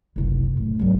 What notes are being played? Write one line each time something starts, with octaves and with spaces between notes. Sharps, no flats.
F#1 C2
A2
G#1 F#3